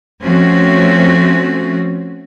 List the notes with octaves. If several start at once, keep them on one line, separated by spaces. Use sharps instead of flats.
F3 A3 C4 C#4 F#4